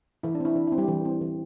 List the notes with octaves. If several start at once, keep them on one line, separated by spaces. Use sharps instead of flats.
E3 E4
D4
C4 E4
E3 D4
C4 E4
G3 G4
E3
C4
E3